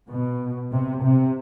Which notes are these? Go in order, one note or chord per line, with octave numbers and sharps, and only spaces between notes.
B2
C3
C3